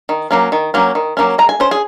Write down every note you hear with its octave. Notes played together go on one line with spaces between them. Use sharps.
D#3
F#3 A#3 C#4
D#3
F#3 A#3 C#4
D#3
F#3 A#3 C#4
G#3 A#5
G#5
C#4 C5
G#4